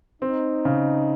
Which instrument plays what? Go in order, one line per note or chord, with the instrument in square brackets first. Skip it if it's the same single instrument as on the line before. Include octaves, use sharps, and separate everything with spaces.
[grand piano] C4 [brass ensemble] D#4
[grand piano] C#3